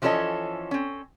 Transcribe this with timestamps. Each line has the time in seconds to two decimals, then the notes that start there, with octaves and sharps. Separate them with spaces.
0.02 E3 F3 C#4 A4 C#5 D#5
0.71 C4 C#4